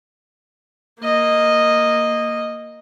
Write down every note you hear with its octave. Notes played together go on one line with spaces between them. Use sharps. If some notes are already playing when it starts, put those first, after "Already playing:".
A#3 D#5